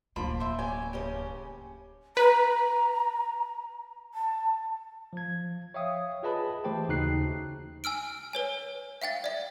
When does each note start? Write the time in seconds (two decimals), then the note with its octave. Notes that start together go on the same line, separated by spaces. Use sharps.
0.16 D1 F3 A#3 F4 B5 D6
0.40 C5 E5
0.59 C#4 G4 D5 G#5
0.93 G2 C#3 C#4 G4
2.17 B4 A#5
4.14 A5
5.13 F3 G#6
5.74 C#5 E5 F5 G5 D#6
6.23 F4 G#4 B4 D#5 A5 B5
6.64 E3 A3 G4 C5 G5 A5
6.88 D#2 C#3 D#4 F#4 F#6 C7
7.84 G#5 E6 F6 D7
8.33 B4 C#5 G#5
9.02 E5 F5 G5 A6
9.24 D5 E5